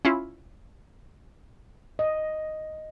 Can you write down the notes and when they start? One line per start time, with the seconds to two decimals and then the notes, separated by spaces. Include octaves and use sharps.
0.05 C#4 E4 F4
1.99 D#5